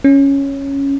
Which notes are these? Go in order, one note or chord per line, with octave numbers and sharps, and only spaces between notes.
C#4